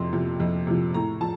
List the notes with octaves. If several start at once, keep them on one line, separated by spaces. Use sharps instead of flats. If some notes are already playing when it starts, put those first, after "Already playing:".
Already playing: F2 C3 C6
C3 F3
F2
C3 F3
A2 A#5
F3 A5